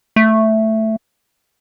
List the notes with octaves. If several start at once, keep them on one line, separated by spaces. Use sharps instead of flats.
A3